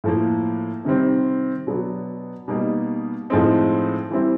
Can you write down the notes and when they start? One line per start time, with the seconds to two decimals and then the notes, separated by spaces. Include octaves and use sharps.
0.04 A2 F3 A#3
0.85 C3 D#3 G3 C4
1.67 B2 F#3 B3 D4
2.48 B2 G3 A#3 D#4
3.30 A2 F3 G#3 C4 D#4
4.11 E3 G3 C4 E4